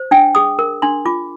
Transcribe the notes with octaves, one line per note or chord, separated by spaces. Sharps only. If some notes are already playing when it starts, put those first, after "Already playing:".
Already playing: C5
D4 G5
G#4 D#6
A#4
D4 C6
F4 D6